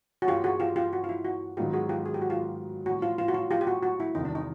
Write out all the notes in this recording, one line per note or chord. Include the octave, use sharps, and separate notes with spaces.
F#4
G2 E3 G3 A#3 D4 F4 G4
F#4 G#4
F4 G4
F4 G4
F#4
F4
E4
F#4
G#2 D#3 F#3 B3 D#4 F4 G4
F#4 G#4
F4 G4
G#4
G4
F#4
F4 G4
A2 E3 G3 B3 F#4
F4
F4
F#4
F4
F4 G4
G4
F#4
F#4
E4
E2 C3 D#3 G3 D#4
D4
D#4